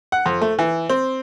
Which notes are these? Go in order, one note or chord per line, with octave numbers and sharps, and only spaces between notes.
F#5
F2
A3
E3
C4